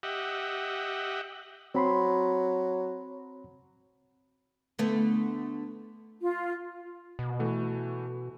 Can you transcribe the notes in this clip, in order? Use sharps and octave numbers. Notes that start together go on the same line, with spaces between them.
G4 D#5 E5 F#5
F#3 C4 B5 C6
D3 A3 B3
F4
B2
E3 A3 F#4